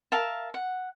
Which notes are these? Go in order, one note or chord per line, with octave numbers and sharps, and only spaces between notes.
A#4 E5 F5 A5
F#5